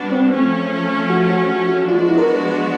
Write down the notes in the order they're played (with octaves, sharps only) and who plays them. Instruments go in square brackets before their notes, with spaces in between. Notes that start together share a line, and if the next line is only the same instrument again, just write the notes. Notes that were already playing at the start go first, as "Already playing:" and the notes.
Already playing: [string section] G3 B3 D4 F#4
[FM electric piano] C4
[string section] F3 A3 C#4 [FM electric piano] C4
[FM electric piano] F#4
F#4
F#4
F#4
[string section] F3 G#3 B3 D4 F#4 [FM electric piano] F4
[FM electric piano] F4
E4
A#4
B4
B4